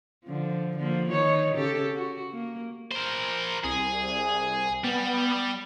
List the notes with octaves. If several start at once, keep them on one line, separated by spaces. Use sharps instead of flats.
D3 F3
D3 F3 A#3
D#3 D#4 C#5
C#3 G4 A4
F#4
A#3
A#4 C5
C2 G#4
G3 B3